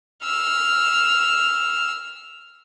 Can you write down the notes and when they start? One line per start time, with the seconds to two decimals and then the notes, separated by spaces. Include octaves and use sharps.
0.24 E6 F6